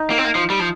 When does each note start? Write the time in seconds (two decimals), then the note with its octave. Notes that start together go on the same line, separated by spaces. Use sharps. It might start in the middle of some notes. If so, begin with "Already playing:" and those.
Already playing: D#4
0.10 A#3
0.18 C4
0.25 A#3
0.35 F3
0.50 G3
0.60 F3